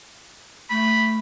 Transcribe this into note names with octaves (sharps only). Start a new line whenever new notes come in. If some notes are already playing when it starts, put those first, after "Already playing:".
A3 B5